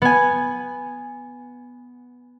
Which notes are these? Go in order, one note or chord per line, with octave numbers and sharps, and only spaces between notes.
B3 G#5